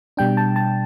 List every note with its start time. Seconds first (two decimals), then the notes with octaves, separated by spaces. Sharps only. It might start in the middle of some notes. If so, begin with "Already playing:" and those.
0.17 B2 G3 D4 G5
0.37 A5
0.56 A5